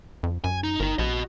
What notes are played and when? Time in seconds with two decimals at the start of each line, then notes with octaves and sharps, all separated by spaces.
0.23 F2
0.44 F#2 G#5
0.64 D#4
0.80 G1 D#4 A#4
0.98 A#1 F#4 D#5